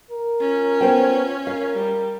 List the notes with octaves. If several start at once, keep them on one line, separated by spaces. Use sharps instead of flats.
A#4
C#4 F4
B3 C5 G5
A#4 F5
G3